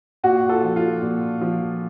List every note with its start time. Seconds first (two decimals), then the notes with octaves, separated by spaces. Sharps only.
0.23 A#2 F#4
0.49 F4 A4
0.63 F3
0.76 F4
1.02 A#2
1.41 F3